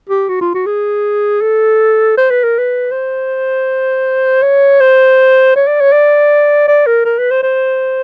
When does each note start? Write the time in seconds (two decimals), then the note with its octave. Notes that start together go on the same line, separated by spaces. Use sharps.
0.09 G4
0.29 F#4
0.41 F4
0.54 F#4
0.66 G#4
1.41 A4
2.17 C5
2.30 B4
2.44 A#4
2.59 B4
2.92 C5
4.42 C#5
4.80 C5
5.56 C#5
5.67 D5
5.81 C#5
5.92 D5
6.68 D5
6.87 A#4
7.05 A#4
7.19 B4
7.31 C5
7.43 C5